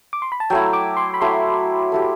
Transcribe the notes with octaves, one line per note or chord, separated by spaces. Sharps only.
D6
C6
B5
A5
F#3 A3 E4 G5
D6
C6
B5
F#3 A3 E4 C6
A3 E4 G4